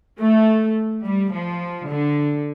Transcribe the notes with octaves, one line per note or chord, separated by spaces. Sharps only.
A3
G3
F3
D3